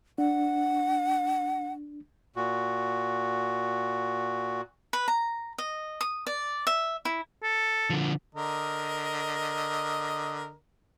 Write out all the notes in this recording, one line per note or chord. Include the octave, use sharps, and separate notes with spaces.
D4 F#5
A#2 F#4
B4
A#5
D#5
D#6
D5
E5
E4
A4
D3 F3
D3 A#4 D#5